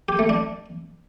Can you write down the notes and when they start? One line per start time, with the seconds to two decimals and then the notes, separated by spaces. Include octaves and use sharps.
0.09 G4
0.19 A3
0.29 D4